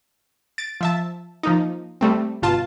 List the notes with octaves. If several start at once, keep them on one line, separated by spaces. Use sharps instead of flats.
A6 D7
F3 E5 A5
F3 A#3 D#4
G3 A3 C4
G1 B2 F4 A5